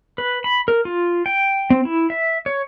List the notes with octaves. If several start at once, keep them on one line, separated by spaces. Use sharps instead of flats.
B4
B5
A#4
F4
G5
C4
E4
E5
C#5